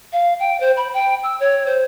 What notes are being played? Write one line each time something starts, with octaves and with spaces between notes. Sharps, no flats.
F5
G5
C5
B5
G5
E6
C#5
C5